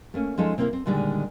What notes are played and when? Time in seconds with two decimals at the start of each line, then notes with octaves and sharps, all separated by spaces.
0.14 A3 A#3 C#4
0.38 F3 G#3 C#4 D#4 A4
0.58 C3 A#3 C4 E4 A#4
0.73 C4
0.86 A#2 D3 D#3 G3 G#3